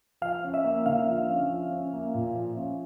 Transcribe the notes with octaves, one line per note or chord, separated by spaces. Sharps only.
F3 F5
C#4
E5
A#3
D3 F5
F3
C#4
F3
C#4
A#3
A#2
F3
C#4